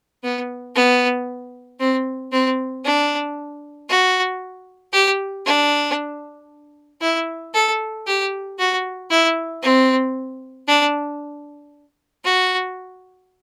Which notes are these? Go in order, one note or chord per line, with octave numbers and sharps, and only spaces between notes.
B3
B3
C4
C4
D4
F#4
G4
D4
E4
A4
G4
F#4
E4
C4
D4
F#4